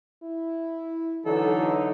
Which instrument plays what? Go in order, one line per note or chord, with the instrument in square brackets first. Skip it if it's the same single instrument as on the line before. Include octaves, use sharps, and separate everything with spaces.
[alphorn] E4
[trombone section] D3 F#3 D#4 [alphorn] E3 [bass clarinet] A4